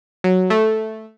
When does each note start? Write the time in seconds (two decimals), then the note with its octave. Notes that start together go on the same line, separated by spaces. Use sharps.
0.24 F#3
0.50 A3